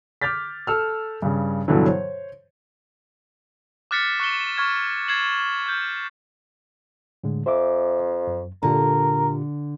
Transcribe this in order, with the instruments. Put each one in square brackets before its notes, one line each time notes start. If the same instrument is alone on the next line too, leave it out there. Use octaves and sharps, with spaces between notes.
[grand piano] D6 F6 G6 A6 B6
A4 E6 F6
G2 C#3
G2 B2 D3 E3 F#3
C5 C#5
[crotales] D6 F6 F#6 A6 B6 C#7
C#6 F#6 C#7 E7 G7
C#6 F6 G#6
G#6 A6 C7 E7 F#7
F6 G6
[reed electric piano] A2 D3 G#3
[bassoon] F2 [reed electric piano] C5 E5 D6
[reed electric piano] F#2
[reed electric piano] A#2 F4 G4 [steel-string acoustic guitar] D3 [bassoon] A#4